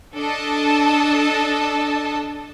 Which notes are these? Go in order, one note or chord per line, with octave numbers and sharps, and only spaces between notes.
D4 A4 D#5 A5